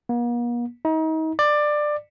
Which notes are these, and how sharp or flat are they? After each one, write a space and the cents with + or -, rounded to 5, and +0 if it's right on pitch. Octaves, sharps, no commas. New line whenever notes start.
A#3 +45
D#4 +35
D5 +15